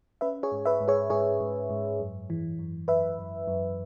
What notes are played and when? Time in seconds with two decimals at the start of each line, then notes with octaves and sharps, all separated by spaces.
0.21 C#4 B4 E5
0.43 G#4 C#5
0.52 G#2
0.65 B4 E5
0.81 G#2
0.88 G#4 C#5
1.10 G#2 G#4 C#5
1.40 G#2
1.70 G#2
2.00 F#2
2.30 E3
2.59 F#2
2.88 F#2 B4 E5
3.19 F#2
3.47 F#2